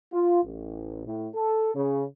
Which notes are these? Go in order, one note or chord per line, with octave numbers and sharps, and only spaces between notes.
F4
A1
A2
A4
C#3